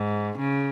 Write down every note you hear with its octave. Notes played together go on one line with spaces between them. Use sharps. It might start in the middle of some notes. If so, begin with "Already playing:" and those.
Already playing: G#2
C#3